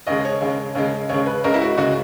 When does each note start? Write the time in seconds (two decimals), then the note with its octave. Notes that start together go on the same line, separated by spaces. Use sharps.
0.07 D#2 C#3 G#3 D#5
0.25 C#5
0.41 D#2 C#3 G#3
0.75 D#2 C#3 G#3
1.09 D#2 C#3 G#3 C#5
1.26 B4
1.44 C#2 C#3 G#3 A#4
1.54 E4
1.62 F#4
1.78 C#2 C#3 G#3 F#4